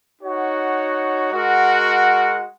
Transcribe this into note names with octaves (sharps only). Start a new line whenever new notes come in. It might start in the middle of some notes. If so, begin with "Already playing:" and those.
D#4 F#4 C#5 F#5
G#3 F#4 A#4 F#5